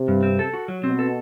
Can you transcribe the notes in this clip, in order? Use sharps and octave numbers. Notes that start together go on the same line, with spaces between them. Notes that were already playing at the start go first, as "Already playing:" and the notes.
Already playing: C3
G2
C4
A4
F#4
F#3
B2 C4
A4